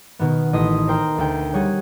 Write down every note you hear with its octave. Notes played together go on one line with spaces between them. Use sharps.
B2 D#3 B3
A1 D#5 C6 D#6 B6
A#4 C5 G5 A#5 C6
D2 G5
G3 G#4 C#5 F#5